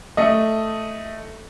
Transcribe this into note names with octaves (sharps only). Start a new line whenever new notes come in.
A3 D#5